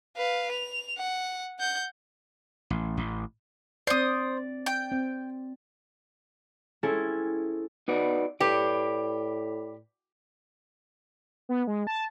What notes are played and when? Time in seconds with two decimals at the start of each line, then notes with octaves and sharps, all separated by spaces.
0.16 B4 F5
0.51 F7
0.97 F#5
1.59 F#5 G6
2.70 A1
2.97 A1
3.87 C4 C5 D5 D#6
4.66 G5
4.92 C4
6.83 C4 C#4 E4 G#4 A4
7.88 B3 D#4 F#4 D5
8.40 A2 G4 B4 D5
11.49 B3
11.67 G#3
11.87 A5